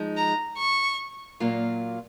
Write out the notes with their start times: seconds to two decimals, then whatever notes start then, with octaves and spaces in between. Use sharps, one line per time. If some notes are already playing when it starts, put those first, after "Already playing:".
Already playing: F3 G#3 D#4
0.17 A#5
0.57 C#6
1.40 A#2 F#3 A#3 F4